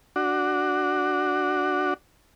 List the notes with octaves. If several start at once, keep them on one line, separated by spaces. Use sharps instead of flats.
D4 F#4